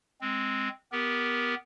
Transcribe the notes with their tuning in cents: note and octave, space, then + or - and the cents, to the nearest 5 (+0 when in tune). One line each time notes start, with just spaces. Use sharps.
G#3 +0 C4 +0
B3 +5 G4 +0 A#4 +10